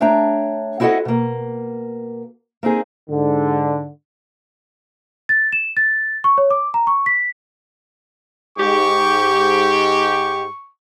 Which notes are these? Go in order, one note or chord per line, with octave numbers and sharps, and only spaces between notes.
A3 D4 C#5 G5 A#5
C4 E4 F#4 A4 D#5 F#5
B2 A#3
A#3 C4 D#4 G#4
G#2 D3
A6
E7
A6
C#6
C#5
D6
A#5
C#6
B6
G#2 G4 C#6